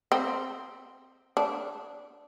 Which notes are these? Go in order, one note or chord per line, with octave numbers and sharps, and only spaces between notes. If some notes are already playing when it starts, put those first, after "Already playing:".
C4
D4